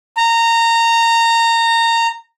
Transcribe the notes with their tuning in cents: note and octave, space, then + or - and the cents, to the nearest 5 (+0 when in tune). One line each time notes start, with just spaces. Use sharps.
A#5 -20